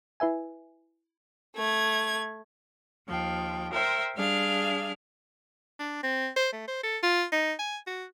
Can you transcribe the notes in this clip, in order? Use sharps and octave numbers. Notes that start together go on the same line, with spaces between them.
E4 B4 E5 G#5
A3 G#6
D#2 F3 G5
A#4 C5 E5 G5
G3 D4 G#4 F5 F6
D4
C4
C5
A3
C5
A4
F4
D#4
G#5
F#4